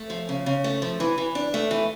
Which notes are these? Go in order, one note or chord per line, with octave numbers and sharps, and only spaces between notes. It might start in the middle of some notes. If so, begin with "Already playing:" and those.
Already playing: A3
F3
C#3
C#3
A3
F3
E3
E3
D4
A3
E3